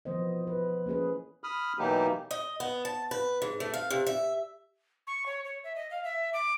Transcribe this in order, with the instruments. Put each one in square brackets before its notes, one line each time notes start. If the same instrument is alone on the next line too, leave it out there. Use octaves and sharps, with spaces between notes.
[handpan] E3 F3 B3 C5 D#5
B4
A#3 C#4 G#4 B4
[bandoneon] B5 D#6 F6
B2 E3 F#3 A#3 D#4 G4
[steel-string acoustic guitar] D#5
B3
A5
B4
G#2
A3
F5
C3
E5
[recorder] C#6
C#5
C#5
E5
D#5
F5
E5
D6